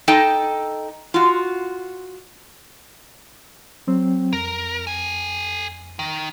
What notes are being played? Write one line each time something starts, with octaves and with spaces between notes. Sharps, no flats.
D#4 A4 D#5 G5
F4 F#4
F#3 C4
F2 A#4
A4 G#5
D#3